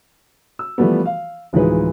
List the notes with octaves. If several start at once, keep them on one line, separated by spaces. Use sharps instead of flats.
E6
E3 F3 G3 A3 B3
F5
D1 E3 F3 G#3 D#4 B4